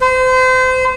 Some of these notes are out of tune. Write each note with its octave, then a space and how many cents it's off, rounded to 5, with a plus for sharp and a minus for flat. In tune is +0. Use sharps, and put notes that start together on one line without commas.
C5 -30